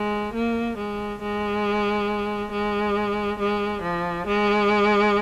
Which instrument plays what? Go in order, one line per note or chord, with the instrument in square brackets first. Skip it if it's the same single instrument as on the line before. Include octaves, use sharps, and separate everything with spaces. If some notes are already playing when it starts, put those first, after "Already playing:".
Already playing: [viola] G#3
A#3
G#3
G#3
G#3
G#3
F3
G#3